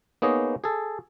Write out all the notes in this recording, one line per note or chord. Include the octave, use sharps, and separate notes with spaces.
A#3 B3 D#4 G#4 C#5 D#5
G#4 A4